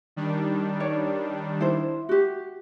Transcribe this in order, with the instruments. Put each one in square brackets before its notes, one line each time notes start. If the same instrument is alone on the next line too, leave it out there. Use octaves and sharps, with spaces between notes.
[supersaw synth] D#3 G3 D4
[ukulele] C#5 D5
E4 C5
F#4 G4